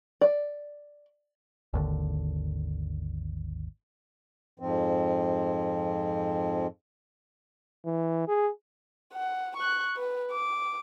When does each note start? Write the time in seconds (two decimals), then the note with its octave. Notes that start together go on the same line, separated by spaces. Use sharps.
0.21 D5
1.73 G#1 D#2 D3
4.60 F2 G#2 F3 C4
7.85 E3
8.28 G#4
9.14 F#5
9.57 C#6 F#6
9.97 B4
10.32 D6